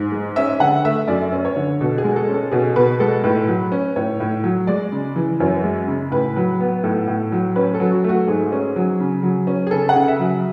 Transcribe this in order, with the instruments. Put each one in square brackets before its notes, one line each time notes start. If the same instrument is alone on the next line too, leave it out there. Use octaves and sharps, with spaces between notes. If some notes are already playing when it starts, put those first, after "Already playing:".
Already playing: [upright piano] G#2
G#3
C#4 E5
D3 F#5
A3 E5
F#2 D5
C#4
C#5
D3
B2 A4
G#4
G#3
A4
C#4
A4
B2 G#4
B2 B4
G#3 A4
A2 B4
F#3
C#4
A2 C#5
A2
F#3
G#3 D5
C#3
E3
F#2 C#5
G#3
C#3
A2 B4
F#3
B3
A2 A4
A2
F#3
C#4 B4
A4
F#3
F#4
A3 F#4
G#2 G#4
C#4
F#3
C#3
F#3
C#4
G#4
C#3 A4
F#5
C#3
E5
F#3